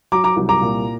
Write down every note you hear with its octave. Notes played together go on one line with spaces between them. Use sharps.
F#3 A#5 D6
A#5 D6
C2
A#5 D6
A#2